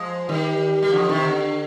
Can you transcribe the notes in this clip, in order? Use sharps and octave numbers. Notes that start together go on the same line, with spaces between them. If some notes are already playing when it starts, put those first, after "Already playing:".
Already playing: F3 G#3
D#3 G3
G3
D3 F3
C3 D#3
D3